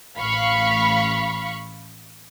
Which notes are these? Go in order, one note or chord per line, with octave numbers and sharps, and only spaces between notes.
A1 F5 B5 C#6